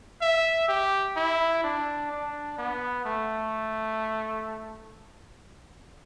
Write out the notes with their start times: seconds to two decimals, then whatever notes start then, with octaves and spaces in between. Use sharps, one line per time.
0.21 E5
0.68 G4
1.16 E4
1.64 D4
2.12 D4
2.58 B3
3.05 A3